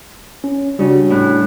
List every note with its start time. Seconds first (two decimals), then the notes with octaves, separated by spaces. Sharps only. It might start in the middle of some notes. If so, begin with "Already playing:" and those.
0.44 C#4
0.79 C#3 G3 D4 F#4
1.10 A2 F#6